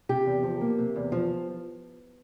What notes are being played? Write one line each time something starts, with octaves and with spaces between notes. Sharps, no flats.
C3 G4
E2
F3
A#3
C3
E2
F3